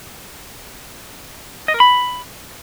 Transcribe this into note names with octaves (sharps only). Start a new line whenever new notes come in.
D#5
A#4
B5